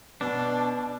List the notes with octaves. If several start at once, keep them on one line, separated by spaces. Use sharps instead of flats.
B2 D4